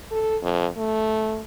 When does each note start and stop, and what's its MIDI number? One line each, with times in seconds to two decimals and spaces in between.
0.11 0.37 69
0.42 0.67 41
0.77 1.42 57